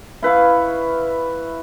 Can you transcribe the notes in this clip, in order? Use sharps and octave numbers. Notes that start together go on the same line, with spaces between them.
E4 B4 F5 C#6